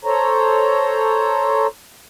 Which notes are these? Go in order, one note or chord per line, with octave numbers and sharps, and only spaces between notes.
A4 C5 C#5 A#5